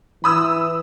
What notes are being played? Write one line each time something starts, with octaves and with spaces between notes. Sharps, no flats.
E3 B5 D#6 E6